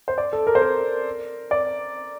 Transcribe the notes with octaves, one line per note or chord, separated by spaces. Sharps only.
C5
D5
A4
A#4
C5
A#4
D5